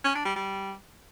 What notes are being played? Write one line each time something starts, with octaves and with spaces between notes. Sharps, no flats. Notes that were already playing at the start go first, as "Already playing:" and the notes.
C#4
D4
G3
G3